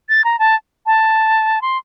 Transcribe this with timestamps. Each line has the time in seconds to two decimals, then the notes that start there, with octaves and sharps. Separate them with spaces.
0.09 A6
0.24 A#5
0.39 A5
0.86 A5
1.62 C6